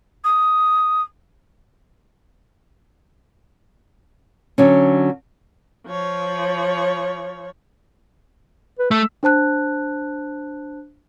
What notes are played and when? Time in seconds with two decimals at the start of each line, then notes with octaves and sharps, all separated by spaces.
0.24 D#6
4.58 D3 F#3 C#4
5.87 F3 C#5
8.79 B4
8.91 A3 E6
9.23 D4 C5 A5 F#6